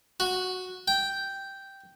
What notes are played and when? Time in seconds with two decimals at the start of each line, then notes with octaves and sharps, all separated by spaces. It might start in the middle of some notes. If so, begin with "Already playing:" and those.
0.20 F#4
0.88 G5